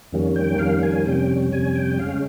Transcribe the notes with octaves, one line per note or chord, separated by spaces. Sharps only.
F2 D#3 G3 A#3 C#4
G5
F2 D#3 G3 A#3 C#4 F5
G#5
F2 C3 G3 C#4 G5
F2 C3 G3 C#4 G#5
G5
C#3 G#3 C#4 F5